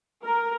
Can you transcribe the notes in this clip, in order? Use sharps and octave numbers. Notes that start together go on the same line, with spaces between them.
A#4